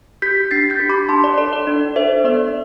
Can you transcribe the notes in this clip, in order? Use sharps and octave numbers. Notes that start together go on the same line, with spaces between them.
G4 G6 B6
D4 A6 C7
G6 B6
G4
B5 D6
D4 A5 C6
D5
A4 D5
D5
D4
A4 C5 E5
B3 D5